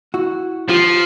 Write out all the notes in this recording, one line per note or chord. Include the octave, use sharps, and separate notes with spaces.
E4 F#4
F3 F4 G4